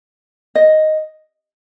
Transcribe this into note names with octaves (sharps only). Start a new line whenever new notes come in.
D#5